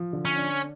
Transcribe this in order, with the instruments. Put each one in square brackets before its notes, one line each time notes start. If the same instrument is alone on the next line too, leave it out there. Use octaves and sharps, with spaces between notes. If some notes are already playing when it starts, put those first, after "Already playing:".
Already playing: [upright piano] F3
D3
[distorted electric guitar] C#4
[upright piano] D4